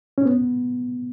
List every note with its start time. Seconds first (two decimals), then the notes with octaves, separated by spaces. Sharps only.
0.18 C#4
0.26 B3